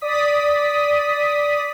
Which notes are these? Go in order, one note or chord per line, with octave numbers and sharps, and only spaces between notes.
D5 D#6 B6